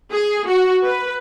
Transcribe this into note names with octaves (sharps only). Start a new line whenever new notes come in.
G#4
F#4
B4